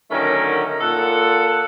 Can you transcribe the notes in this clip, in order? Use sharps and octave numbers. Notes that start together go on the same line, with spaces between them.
D3 D#3 F#3 A3 C#4 A#4
A#2 A4 F#5